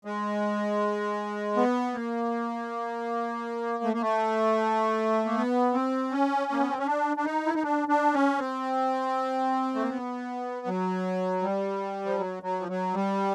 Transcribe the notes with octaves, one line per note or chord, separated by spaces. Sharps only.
G#3
B3
A#3
A3
A#3
A3
A#3
B3
C4
C#4
A#3
B3
C4
C#4
D4
D4
D#4
E4
D#4
D4
D4
C#4
C4
A3
A#3
B3
F#3
G3
F3
F#3
F#3
F3
F#3
G3